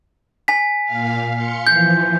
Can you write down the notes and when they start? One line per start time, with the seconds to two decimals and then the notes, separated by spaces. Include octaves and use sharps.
0.48 G#5 B6
0.85 A#2 F5
1.34 F5 C6 C#7
1.67 E3 F3 G6